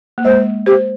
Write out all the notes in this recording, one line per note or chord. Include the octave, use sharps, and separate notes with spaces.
A#3
G#3 C5
G4 C5